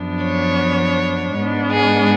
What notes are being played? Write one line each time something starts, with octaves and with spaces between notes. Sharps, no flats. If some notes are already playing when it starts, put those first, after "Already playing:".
Already playing: F#2 F3 B3 D4
C#5
G#2 G#3 B3 D4
G#4